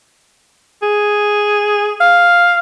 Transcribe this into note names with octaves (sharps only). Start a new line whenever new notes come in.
G#4
F5